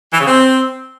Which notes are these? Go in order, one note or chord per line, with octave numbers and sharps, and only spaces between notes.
E3
C#3
C4